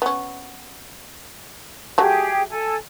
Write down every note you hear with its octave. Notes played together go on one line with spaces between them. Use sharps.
B3 C#4
F#3 A3 G4 G#4
A4 G#5